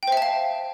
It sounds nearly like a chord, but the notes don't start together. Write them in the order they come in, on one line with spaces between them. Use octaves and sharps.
G5 C5 E5 A5 F5